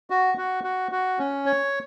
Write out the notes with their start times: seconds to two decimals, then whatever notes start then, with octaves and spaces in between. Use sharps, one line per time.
0.10 F#4
0.38 F#4
0.64 F#4
0.92 F#4
1.19 C#4
1.46 C#5